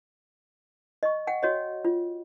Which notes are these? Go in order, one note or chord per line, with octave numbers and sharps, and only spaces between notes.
D#5 C#6
F#5 G5
F#4 C#5 D#5
F4